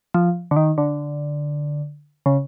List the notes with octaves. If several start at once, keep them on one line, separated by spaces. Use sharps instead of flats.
F3
D3
D#3
D3
C#3